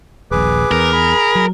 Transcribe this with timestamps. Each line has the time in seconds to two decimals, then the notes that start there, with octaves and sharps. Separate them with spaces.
0.31 D#1 A#1 G#4 B4 D6
0.71 E2 A#4
0.93 G#4 B5
1.35 F#3